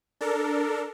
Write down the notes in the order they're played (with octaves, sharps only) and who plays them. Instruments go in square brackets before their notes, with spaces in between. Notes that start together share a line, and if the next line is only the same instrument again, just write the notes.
[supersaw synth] D4 A4 A#4